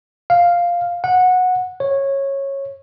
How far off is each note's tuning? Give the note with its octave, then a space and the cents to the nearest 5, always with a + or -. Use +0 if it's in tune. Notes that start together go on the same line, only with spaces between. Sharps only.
F5 +0
F#5 -15
C#5 -15